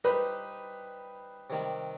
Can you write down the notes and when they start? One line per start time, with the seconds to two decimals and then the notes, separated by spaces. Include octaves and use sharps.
0.04 G3 D#4 G4 B4 C5
1.50 C3 D#3 G3